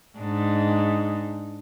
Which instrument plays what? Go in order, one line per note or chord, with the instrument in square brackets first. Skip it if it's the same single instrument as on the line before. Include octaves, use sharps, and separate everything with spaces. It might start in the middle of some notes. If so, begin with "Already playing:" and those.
[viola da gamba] G#2 D4 D#4